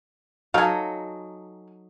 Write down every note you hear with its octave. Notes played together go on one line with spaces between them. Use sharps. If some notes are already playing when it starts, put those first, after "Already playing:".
F#3 D#4 A4 F5 G#5